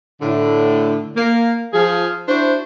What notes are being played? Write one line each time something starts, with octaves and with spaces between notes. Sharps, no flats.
A2 D3
A#3
F3 G#4
D4 E4 F#4 C5